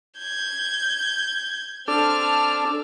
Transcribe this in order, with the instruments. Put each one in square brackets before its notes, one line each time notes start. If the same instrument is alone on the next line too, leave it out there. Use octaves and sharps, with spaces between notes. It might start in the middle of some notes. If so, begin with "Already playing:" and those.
[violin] G6 G#6
[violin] C4 F6 [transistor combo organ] D4 A4 D6